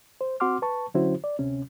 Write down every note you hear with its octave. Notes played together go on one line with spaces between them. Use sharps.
C5
C4 F#4 F#5 C6 D6 F6
B4 A5 C#6
D3 F#3 C#4 E4 F#4 C5
D5
D2 C3 C#4